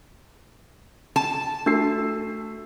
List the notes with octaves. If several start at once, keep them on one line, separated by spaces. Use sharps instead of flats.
A5
A3 D4 F#4 E6 C7